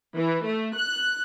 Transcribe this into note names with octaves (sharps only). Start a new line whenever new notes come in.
E3
A3
F#6